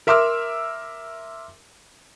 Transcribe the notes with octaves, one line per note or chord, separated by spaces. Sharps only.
A#4 E5 C6 D6 E6 F6